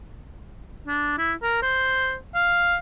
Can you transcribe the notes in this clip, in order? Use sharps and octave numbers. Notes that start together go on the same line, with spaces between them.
D4
E4
A#4
C5
F5